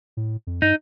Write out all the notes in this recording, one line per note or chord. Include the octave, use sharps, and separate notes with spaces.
A2
F2
G2 D#4